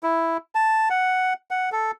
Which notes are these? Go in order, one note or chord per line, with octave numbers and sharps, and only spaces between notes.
E4
A5
F#5
F#5
A4